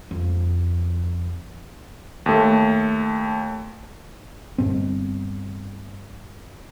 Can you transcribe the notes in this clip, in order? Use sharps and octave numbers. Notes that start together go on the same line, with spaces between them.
F2
D#2 A3
G1 G2 C4